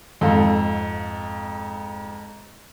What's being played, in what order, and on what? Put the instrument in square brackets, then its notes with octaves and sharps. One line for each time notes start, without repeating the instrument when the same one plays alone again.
[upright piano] F2 G#2 A4 F5